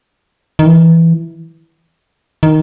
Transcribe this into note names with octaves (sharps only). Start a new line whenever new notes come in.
D#3
E3
D#3